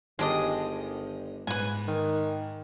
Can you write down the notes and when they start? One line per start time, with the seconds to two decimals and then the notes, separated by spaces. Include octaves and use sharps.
0.19 G1 D#3 G#3 D4 G4 D#5
1.47 G#2 B4 G#5
1.88 D#3